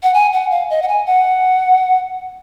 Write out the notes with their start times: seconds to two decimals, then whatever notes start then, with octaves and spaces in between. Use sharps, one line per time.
0.03 F#5
0.14 G#5
0.33 F#5
0.51 F5
0.70 D#5
0.82 F#5
0.88 G#5
1.06 F#5